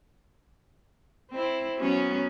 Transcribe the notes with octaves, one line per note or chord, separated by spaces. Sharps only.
C4 E4
F#3 B3 C#4